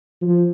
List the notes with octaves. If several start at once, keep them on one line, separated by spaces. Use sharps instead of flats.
F3